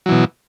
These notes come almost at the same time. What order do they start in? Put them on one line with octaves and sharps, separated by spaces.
F#3 E3 B2